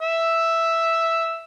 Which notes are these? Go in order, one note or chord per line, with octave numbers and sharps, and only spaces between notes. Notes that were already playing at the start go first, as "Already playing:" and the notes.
E5 E6